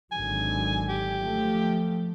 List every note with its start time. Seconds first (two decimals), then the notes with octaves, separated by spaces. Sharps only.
0.12 G#1 D3 F#3 G#5
0.89 G4
1.18 F3 A3